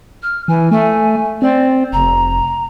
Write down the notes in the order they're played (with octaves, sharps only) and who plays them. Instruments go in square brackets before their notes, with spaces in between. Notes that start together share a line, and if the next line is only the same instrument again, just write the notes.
[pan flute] F6
[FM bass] E3 [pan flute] G#5
[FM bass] A3 [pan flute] G#5
[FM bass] C4 [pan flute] D5
[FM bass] F1 [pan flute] A#5